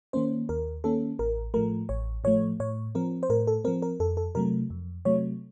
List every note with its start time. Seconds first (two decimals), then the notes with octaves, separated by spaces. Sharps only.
0.13 D#3 A#3 C#4 C5
0.49 D#2 A#4
0.84 D#3 A#3 C#4 A4
1.19 A1 A#4
1.54 A2 F3 A3 A#4
1.89 A1 C#5
2.24 A2 F3 A3 C#5
2.60 A2 C#5
2.95 F3 C4 A#4
3.23 C5
3.29 A2 A#4
3.47 A4
3.64 C4 A#4
3.68 F3
3.82 A#4
4.00 F2 A4
4.17 A4
4.35 C3 F#3 A3 A#4
4.70 F2
5.05 C3 F#3 A3 C#5